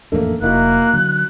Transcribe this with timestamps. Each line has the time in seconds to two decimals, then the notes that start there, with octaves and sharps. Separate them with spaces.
0.12 A1 F2 A3 A#3 D4
0.42 F1 A#3 D#4 E4 F#4 F#6
0.93 D3 F#3